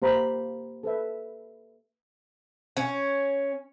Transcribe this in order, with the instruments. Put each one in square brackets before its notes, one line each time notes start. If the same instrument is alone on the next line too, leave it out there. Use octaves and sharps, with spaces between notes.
[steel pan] A#3 G4 C5 F5 A#5 B5
A4 B4 E5
[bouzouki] C#4